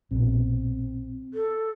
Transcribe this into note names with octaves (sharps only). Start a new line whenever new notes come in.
A#1 B2 C4
A4